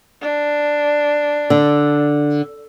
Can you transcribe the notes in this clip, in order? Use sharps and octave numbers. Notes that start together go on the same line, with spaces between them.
D4
D3